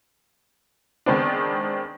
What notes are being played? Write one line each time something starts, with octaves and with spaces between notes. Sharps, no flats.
D#3 G#3 B3 C4 D4